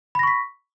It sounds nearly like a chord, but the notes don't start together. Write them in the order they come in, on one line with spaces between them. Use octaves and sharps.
B5 A#6 C#6 B6